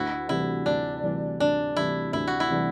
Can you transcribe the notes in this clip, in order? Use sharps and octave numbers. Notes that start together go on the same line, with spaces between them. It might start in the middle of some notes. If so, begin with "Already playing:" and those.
Already playing: D2 E4 F#4
C3 E3 G3 E4
D2 D4
C3 E3 G3
D2 D4
C3 E3 G3 E4
D2 E4
F#4
E4
C3 E3 G3